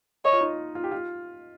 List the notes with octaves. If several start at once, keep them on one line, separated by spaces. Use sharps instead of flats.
C#5 D#5
F4
D#4
F4
G4
F4